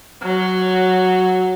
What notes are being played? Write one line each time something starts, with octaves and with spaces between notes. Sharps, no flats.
F#3